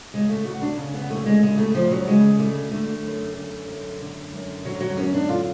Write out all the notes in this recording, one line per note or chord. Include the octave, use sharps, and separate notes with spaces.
C#3 G#3
A3
D2 F#4
D4
C#3
B3
D2 A3
G#3
C#3 G#3
A3
D2 F3
F#3
C#3 G#3
D2 A3
D3 A3
F#2
D3
F#2
D3
F#2
D3 F#3
F#3
F#2 C#4
D4
D3 F4